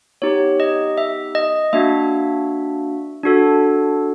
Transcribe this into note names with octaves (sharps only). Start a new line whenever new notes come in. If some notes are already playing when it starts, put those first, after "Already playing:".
B3 D#4 G4 C#5
D#5
E5
D#5
A#3 D4 F#4 E5
D4 F#4 A4